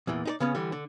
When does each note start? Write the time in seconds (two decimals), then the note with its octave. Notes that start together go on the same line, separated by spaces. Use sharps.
0.07 E2 A#2 E3
0.25 D#4 G#4 D5
0.40 C#3 B3 C#4
0.55 D3 E3 G3
0.72 D3